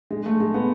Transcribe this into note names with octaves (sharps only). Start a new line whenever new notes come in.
G#3
A3
G#3
B3